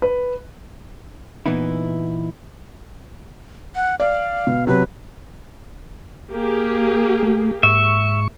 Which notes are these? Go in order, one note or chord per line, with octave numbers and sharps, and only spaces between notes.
B4
A#2 E3 B3 D#4 E4
F#5
D5 F5
B2
C3 F#3 B4
A#3 G4 G#4
A3
G#2 E5 C#6